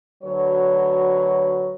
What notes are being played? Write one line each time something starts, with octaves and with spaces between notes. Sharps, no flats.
D2 F#3 B4 C#5